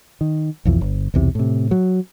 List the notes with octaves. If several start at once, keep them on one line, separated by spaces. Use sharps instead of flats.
D#3
B1 F2 E3
G1
B1 E2 C3
A2 C3
F#3